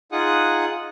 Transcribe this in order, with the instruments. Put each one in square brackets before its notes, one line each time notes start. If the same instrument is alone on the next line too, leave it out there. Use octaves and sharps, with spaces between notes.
[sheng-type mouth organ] D#4 F4 G#4 F#5 D#6 F#6